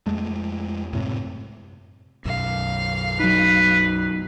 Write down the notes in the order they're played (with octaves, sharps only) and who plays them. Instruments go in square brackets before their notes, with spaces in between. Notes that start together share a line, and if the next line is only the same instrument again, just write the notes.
[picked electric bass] F2 G#3 A3
F#2 A2 C3
[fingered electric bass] B1 F#2 [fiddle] F5
[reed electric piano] F#3 D#4 [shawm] B4